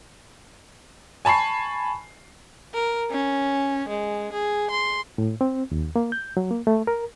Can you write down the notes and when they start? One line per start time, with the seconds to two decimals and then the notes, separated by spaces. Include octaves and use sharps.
1.25 G#5 A5 B5 C#6 C7
2.74 A#4
3.10 C#4
3.88 G#3
4.32 G#4
4.70 C6
5.18 A2
5.41 C4
5.72 D#2
5.96 A#3
6.12 G6
6.37 F#3
6.51 A#3
6.67 A3
6.87 A#4